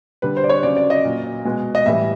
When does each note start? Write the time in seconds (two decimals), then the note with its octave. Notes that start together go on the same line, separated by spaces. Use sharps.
0.22 D3 G3 B4
0.37 C5
0.44 D5
0.49 C#5
0.63 C#3 F#3 D5
0.77 D5
0.90 D#5
1.04 A#2 F#3
1.45 B2 G#3
1.75 D#5
1.86 A2 E3 G3 E5